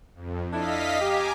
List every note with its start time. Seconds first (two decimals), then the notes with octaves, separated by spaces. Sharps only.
0.15 F2
0.53 D4 E4 A4 D#5 F5 B6
1.01 G4 G#5 A#5 D6